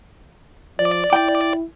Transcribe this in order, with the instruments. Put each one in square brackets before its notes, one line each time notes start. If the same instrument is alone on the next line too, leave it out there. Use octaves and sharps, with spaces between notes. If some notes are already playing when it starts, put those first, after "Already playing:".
[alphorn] F3 [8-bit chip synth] D5
[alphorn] E4 [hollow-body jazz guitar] G5